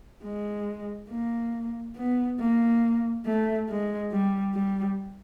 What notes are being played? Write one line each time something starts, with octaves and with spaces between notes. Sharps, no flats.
G#3
A#3
B3
A#3
A3
G#3
G3
G3